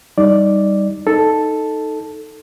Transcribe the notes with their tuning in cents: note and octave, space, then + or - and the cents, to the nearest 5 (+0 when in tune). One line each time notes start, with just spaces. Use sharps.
G3 +0 D#4 +0 D5 +0
D#4 +0 A4 +0